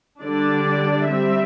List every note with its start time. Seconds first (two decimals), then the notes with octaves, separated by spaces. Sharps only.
0.22 D3 G3 D4 D5
1.09 G3 C4 E5